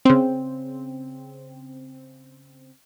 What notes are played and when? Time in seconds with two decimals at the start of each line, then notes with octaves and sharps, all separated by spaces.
0.05 C#3 C4